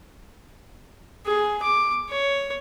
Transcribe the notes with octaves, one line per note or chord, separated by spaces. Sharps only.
G#4
D6
C#5